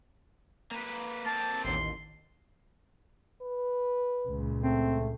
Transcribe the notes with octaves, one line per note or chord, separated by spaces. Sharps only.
A#3 B4
A#3 C4 A5
A1 D#2 C6
B4
C#2 A#2
A3 C4